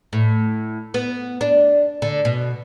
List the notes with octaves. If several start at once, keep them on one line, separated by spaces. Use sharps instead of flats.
A2
B3
D4
D3
B2